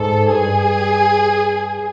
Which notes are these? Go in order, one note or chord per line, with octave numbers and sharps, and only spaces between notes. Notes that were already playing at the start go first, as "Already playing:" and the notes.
Already playing: G#2 A4
G2 G#4